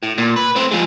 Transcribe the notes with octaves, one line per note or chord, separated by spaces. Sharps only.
A2
A#2
B4
A2 C4
F3 G#3